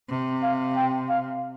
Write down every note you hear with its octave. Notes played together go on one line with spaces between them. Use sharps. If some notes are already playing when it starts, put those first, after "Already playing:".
C3
F5
G5
F5